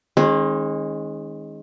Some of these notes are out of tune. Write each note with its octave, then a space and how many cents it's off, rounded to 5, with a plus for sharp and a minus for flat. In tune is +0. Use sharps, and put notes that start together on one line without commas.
D#3 +5 G#3 +0 C#4 -45